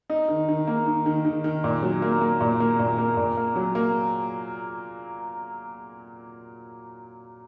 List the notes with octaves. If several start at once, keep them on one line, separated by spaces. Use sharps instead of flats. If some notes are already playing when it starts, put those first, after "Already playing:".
D#4
D#3
D#3
A#3
D#3
D#3
D#3
D#3
A#2
F#3
A#3
A#3
A#2
A#3
A#2
A#3
A#2
A#3
F#3
A#3